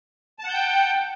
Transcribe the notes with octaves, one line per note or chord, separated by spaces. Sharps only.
F#5 G5 A5 G6